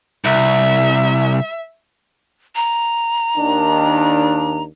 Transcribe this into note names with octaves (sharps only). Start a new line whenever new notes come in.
C2 E5
A#5
D#2 D#3 D4